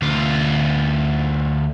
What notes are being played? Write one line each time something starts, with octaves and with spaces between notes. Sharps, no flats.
D2 F4